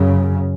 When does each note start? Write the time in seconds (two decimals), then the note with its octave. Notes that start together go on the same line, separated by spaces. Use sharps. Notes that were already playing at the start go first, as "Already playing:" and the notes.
Already playing: F#2 C#3